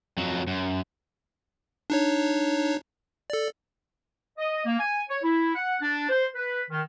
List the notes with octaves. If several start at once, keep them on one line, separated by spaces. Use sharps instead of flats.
F2 F#3
F#2
D4 D#4 C#5
A4 D5
D#5
A#3
G#5
C#5
E4
F#5
D4
C5
B4
D#3